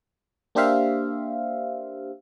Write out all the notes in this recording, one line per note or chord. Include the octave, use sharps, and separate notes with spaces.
A#3 D4 G4 C5 E5 F5